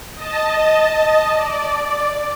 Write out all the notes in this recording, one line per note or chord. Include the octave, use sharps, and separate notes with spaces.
D#5 A5
D5